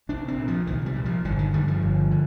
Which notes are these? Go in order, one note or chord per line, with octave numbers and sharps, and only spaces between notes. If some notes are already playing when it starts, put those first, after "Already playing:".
C2 D4
C4
A#2
F3
C2 D#3
G3
A#2
F3
G1 D3
D#3
G2 D3 G3
F3
G1
D3